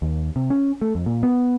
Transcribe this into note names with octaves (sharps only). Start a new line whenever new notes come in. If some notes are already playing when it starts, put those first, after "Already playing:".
D#2
C3
C#4
A3
F2
A#2
B3